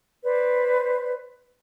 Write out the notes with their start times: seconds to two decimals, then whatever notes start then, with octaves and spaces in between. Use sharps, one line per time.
0.23 B4 C5 D5